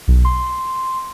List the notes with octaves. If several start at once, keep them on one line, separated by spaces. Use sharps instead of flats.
B1
C6